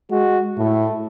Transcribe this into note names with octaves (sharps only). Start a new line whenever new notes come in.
G#3 F#4
A2 A3